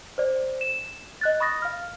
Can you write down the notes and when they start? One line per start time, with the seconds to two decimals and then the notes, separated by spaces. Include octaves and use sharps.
0.18 C5 D5
0.61 E7
1.21 D#5 F#6 A6
1.40 B5 C#6 D#6 A6 A#6
1.62 F5 F6